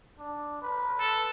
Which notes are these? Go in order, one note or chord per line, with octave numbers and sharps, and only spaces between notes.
D4
B4
A4